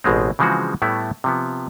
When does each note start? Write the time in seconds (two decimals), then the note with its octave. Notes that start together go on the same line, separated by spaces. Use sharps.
0.04 A1 B2 G#3 C4
0.39 C#3 E3 F3 G#3 C4 F#4
0.82 A2 G3 A3 B3 E4
1.24 C3 F3 B3